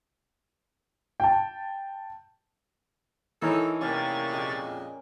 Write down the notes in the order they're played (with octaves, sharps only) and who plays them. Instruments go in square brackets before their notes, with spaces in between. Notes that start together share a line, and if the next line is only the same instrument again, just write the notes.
[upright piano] G5 A5
[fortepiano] E3 D#4 C#5 [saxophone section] A4 [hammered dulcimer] A#4
[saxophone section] E2 A#3 [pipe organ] C3 C#6 A6 [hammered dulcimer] C#4 D5 G5
[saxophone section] F2 A#2 G#3